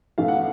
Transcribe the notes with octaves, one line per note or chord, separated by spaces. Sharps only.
B1 A2 E3 A3 F5
F#5